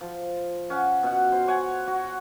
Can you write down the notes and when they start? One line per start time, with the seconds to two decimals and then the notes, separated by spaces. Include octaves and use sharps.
0.01 F3
0.70 C#4 F#5
1.03 B2 F#5
1.32 C5
1.48 C#5 F#5 G#5
1.87 F#4